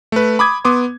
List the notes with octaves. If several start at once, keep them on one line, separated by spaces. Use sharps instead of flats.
A3 B4
B5 D6 D#6 G#6
B3 C6 D6 D#6